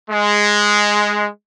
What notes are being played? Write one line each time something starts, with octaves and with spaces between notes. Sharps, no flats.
G#3